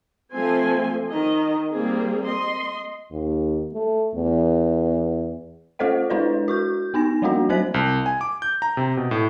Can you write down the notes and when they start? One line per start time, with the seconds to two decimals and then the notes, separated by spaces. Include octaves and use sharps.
0.34 F3 A3 C4 G#5 C6
1.10 D#3 D#5
1.72 G3 A#3 C4 G#4
2.26 D#5 C6
3.11 D#2
3.73 A3
4.14 E2
5.79 A3 F4 A4 C5 D#5 F#5
6.10 G#3 D4 E4 B4 C#5 D5
6.48 F#4 C#6 G6
6.94 B3 D#4 G#5 A#6
7.22 F3 G3 A3 A#3 D4 F#4
7.49 F#3 C4 C5 F#6 B6 F#7
7.74 C2
8.06 G#5
8.21 D6
8.42 G6
8.62 A#5
8.77 C3
8.97 B2
9.11 A2